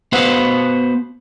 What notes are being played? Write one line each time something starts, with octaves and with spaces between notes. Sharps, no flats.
B3 F#4 B4 C5 F5 F#5